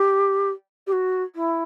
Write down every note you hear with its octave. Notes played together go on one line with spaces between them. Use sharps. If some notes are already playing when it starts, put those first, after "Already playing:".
Already playing: G4
G4
F#4
E4